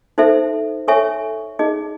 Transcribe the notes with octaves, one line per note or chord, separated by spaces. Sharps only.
D#4 A4 C5 E5
A4 C#5 E5 G#5 C#6
D#4 G#4 D#5